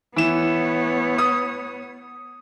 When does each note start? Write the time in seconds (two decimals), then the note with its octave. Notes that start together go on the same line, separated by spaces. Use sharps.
0.16 E3 B3 C#5 E7
1.18 D#6